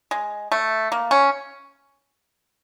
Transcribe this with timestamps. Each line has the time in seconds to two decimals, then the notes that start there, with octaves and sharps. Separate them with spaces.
0.11 G#3
0.52 A3
0.92 A#3
1.11 C#4